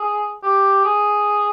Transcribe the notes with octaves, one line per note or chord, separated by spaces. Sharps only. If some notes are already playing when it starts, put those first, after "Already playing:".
Already playing: G#4
G4
G#4